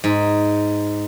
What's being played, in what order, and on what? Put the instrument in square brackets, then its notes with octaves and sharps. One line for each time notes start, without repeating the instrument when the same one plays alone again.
[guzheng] G#2